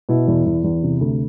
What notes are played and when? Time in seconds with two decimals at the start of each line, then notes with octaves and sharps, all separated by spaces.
0.09 B2 E4
0.28 E2
0.46 E2
0.64 E2
0.83 C3
1.01 D2